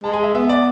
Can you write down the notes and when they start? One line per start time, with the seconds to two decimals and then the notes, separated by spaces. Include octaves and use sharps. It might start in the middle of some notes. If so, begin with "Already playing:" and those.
0.04 G#3 A5
0.14 G#5
0.23 E5
0.34 B3 E5
0.49 D5